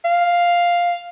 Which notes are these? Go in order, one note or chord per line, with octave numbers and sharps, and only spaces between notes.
F5